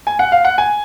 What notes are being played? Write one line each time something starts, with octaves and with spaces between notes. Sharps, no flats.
G#5
F#5
F5
F#5
G#5